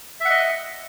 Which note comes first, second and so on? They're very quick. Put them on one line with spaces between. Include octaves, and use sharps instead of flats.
E5 F#5 D#5